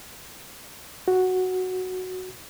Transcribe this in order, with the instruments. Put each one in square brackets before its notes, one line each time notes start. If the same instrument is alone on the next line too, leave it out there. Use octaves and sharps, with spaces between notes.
[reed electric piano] F#4